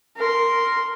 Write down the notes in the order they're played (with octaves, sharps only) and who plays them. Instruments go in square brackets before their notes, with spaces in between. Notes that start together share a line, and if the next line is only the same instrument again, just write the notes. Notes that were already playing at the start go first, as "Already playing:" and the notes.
[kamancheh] A#4 C6